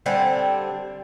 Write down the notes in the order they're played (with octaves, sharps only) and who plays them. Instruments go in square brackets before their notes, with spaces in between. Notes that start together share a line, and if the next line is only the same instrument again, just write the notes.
[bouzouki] D3 G3 C4 G#5